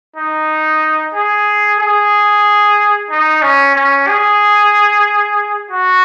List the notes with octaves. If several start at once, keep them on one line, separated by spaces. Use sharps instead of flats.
D#4
G#4
G#4
D#4
C#4
C#4
G#4
F#4